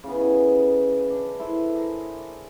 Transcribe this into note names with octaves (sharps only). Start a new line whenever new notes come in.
C#3 E3 B3
C#4 G#4 A4 G#5
D4
E4 A4 B4 C5
G#4 A#4